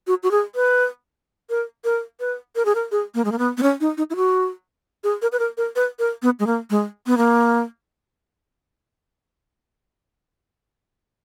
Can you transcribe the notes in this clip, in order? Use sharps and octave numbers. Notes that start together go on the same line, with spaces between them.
F#4
F#4
G#4
B4
A#4
A#4
B4
A#4
G#4
A#4
G#4
A#3
G#3
A#3
B3
B3
C#4
D#4
D#4
E4
F#4
G#4
A#4
B4
A#4
A#4
B4
A#4
B3
G#3
A#3
G#3
B3
A#3